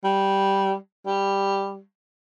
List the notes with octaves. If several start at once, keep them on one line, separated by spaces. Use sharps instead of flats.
G3
G3